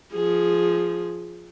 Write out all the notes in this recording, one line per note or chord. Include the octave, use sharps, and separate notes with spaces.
F3 G#4